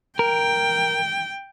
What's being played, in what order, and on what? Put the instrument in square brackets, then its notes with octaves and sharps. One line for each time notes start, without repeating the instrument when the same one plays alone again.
[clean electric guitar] A#4 [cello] G5